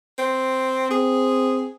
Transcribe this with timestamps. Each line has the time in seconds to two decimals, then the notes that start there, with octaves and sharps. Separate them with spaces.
0.18 C4
0.91 C4 G#4